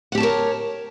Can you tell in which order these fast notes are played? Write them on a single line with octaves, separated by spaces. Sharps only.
F#5 G4 A5 C#5 A#4